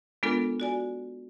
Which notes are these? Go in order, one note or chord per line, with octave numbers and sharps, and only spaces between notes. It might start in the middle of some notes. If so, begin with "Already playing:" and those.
G#3 B3 D4 F4 A4 A#4
F#4 D5 G#5